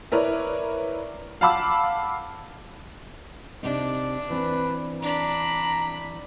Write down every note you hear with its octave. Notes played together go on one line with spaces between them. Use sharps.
E4 A#4 B4 C#5 D5
F5 F#5 A5 B5 D6 E6
C3 D4 D#4
E3 C4 B4
D4 A#5 B5